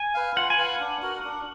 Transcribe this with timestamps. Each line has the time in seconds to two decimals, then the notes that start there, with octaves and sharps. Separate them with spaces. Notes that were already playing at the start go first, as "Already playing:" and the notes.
Already playing: G#5
0.14 B4 F5
0.36 F4 F#5
0.50 G#5
0.58 B4 F5
0.65 F#5
0.80 D4
1.02 F#4 A#4
1.24 D4